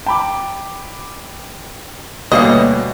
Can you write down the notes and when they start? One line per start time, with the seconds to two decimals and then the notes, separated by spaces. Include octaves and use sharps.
0.06 G5 A5 B5 D6
2.32 D2 B2 G3 A#3 B4 C#5 D#5 F5